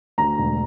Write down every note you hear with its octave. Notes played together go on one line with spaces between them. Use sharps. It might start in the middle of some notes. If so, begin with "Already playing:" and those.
D2 A#5
E1